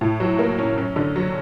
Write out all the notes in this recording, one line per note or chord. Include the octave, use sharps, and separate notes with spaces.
A2
F#3
A#3
C#4
F#2
D3
F#3